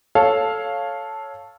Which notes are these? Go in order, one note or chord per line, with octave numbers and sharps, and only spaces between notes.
A4 C#5 F5 A5